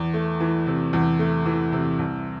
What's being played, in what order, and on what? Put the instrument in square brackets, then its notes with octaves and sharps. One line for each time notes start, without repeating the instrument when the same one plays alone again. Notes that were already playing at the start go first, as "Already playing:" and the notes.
Already playing: [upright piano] E2
A3
E3
C3
E2
A3
E3
C3
C2